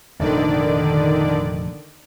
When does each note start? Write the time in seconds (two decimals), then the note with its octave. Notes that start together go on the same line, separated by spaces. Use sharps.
0.20 F1 A#1 D3 D#3 D5